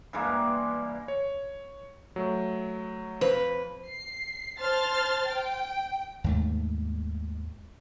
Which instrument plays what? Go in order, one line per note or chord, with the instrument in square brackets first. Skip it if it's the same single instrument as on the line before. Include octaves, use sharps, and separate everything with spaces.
[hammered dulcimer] G2 E3 G#3 A#3
[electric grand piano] C#5
F#3 A3
[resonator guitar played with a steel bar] F2 B4 [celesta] C5
[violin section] C7
C5 A5 C6 F6 A6
G5
[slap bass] D#2 G#2 A3